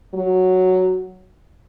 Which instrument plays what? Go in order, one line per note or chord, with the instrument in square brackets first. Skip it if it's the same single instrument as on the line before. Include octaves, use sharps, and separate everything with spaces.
[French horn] F#3